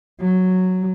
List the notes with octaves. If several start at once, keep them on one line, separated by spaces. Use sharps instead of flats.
F#3